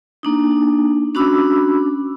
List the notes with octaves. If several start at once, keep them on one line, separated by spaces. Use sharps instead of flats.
A#3 D4 D#4
C#4 D4 F#4 B5 D6 E6